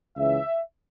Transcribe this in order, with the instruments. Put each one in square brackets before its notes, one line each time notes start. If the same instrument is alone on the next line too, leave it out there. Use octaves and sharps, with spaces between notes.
[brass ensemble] C#2 C#3 E3 E5